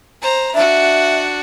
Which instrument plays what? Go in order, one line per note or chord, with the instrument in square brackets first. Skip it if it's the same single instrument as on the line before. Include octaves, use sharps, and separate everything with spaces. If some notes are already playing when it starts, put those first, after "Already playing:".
[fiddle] C5 A#5
[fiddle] D4 F#4 [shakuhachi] E5